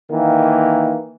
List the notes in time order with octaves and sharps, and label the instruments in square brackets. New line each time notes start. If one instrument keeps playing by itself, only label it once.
[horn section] D#3 E3 A#3